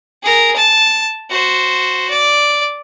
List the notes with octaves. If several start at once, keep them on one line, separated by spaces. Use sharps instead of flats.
G#4 A#4
A5
F#4 C5
D5